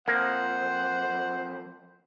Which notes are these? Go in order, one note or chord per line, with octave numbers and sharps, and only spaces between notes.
F2 A#3 C5 F#5